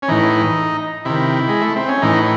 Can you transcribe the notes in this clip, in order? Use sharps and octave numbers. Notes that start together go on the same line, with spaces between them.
C#4
A2 E3 D#4
C3 D#3 E4
G#3
A3
C4
C#4
A2 E3 D#4